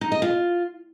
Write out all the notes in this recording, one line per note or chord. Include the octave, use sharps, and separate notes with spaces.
D#4
D#5
F4